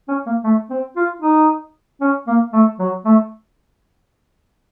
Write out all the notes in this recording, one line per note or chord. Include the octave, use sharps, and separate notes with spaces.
C#4
A#3
A3
C4
F4
D#4
C#4
A#3
A3
F#3
A3